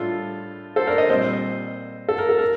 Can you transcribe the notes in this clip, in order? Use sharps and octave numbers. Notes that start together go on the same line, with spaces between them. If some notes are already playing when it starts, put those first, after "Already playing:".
Already playing: A2 G3 D4 F4 A4
A4 C5
A#4 D5
C5 D#5
A#2 G3 C4 C5 D#5
A4
A#4
A4
A#4